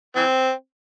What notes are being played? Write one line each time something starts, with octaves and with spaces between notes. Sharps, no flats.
E3 C4